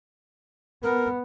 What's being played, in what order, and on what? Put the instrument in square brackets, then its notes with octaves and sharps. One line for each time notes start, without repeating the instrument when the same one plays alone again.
[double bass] B3 [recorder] A#4